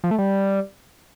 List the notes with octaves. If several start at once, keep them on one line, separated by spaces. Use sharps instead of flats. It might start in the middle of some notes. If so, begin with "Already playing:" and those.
F3
A3
G3